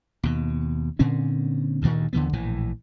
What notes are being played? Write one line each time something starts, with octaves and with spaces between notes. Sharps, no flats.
D#2 B2
A#2 D3 C4 C#4
D2 G2 A#2 D#3
D#2 D3 E3 B3
A#1 A2 E3